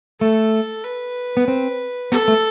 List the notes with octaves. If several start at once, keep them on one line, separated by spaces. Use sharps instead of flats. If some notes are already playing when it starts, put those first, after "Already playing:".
A3 A4
B4
B3
C4
B3 A4
A3